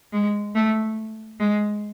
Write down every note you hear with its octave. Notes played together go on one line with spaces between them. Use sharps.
G#3
A3
G#3